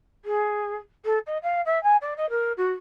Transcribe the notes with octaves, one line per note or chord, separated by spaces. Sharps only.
G#4
A4
D#5
F5
E5
G#5
D5
D#5
A#4
F#4